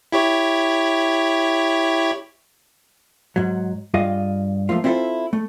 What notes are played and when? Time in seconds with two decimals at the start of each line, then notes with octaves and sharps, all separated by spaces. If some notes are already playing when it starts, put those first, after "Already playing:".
0.12 E4 G4 C#5
3.36 G#2 F#3
3.94 G2 F4 G#4 D#5 F5
4.69 F3 A3 A#3 F4
4.84 C4 E4 F4 G4 A4 C5
5.33 A3